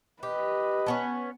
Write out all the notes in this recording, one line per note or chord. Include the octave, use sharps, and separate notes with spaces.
G4 B4 D#5
A3 B3 C#4